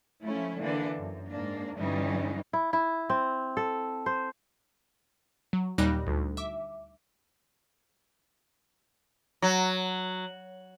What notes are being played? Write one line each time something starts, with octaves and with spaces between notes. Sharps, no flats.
F3 A3 C#4 E4
D3 E3 A#3 D4
F#2
G#2 A#3 D4
G2 D3 E3 G3 C#4 D#4
E4
E4
C4
A4
C5
F#3
D#2 A#2 G3 D#4 F#6 A#6
D2
E5 D6
F#3